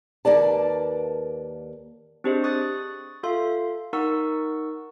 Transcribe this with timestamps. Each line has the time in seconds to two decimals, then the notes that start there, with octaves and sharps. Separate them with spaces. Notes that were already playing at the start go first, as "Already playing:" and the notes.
0.25 D#2 A#3 B4 D5 A5
2.24 C4 D4 G4 G#4 C5 D#5
2.44 C#6 D#6 F#6 A6
3.23 F4 A4 E5 F5 C6
3.93 D#4 A#4 F#5 C#6 E6